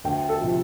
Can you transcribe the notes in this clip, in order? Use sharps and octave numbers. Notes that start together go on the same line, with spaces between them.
D2 G5
A4
C3 F3